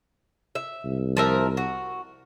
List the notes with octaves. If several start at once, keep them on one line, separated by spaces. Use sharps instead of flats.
E5
C2
F3 A#4 E5
F#4